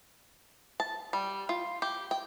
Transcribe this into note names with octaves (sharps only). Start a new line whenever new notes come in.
A5
G3
F4
G4
G5